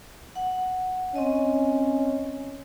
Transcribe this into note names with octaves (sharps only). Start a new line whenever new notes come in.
F#5
C4 C#4 D#5